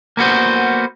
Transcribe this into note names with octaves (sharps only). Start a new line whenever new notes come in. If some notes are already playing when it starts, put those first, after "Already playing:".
A#3 B3 F#4 C5